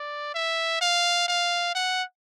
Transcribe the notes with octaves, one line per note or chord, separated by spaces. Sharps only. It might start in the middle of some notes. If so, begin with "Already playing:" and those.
Already playing: D5
E5
F5
F5
F#5